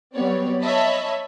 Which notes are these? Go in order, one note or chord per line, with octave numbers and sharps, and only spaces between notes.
F#3 G3 B3 C4 C#5 D5
C#5 D#5 E5 A5 B5